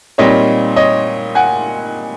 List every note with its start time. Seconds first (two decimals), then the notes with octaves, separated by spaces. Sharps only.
0.18 A#2 G3 C4 D#4 C#5 D#5
0.76 C#5 D#5
1.35 F#5 G#5